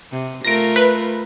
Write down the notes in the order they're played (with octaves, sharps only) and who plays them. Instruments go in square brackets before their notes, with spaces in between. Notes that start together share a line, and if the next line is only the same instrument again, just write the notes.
[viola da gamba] C3
[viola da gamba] A3 F4 A#4 [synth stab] A#6 D7
[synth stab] B4